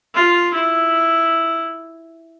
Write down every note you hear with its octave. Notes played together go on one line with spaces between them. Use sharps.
F4
E4